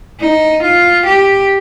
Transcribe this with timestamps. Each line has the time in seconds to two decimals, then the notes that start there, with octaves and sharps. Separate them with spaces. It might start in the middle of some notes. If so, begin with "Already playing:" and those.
0.20 D#4
0.63 F4
1.06 G4